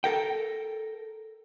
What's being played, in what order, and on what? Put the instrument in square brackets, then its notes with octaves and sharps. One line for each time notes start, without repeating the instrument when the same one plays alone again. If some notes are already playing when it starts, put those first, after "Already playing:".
[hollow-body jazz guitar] A4 A#4 G5